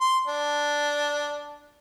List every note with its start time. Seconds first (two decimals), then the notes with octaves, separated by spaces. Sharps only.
0.01 C6
0.28 D4